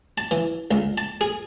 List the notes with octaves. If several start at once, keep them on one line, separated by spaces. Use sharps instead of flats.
A5
E3
C#2
A5
G#4